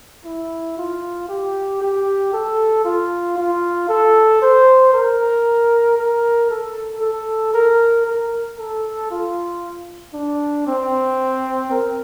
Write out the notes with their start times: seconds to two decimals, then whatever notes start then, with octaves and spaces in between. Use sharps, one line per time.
0.25 E4
0.78 F4
1.29 G4
1.81 G4
2.33 A4
2.85 F4
3.38 F4
3.89 A4
4.42 C5
4.93 A#4
5.98 A#4
6.50 A4
7.01 A4
7.54 A#4
8.07 A#4
8.58 A4
9.11 F4
10.14 D4
10.67 C4
11.71 A#4